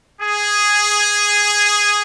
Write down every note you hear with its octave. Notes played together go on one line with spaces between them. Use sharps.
G#4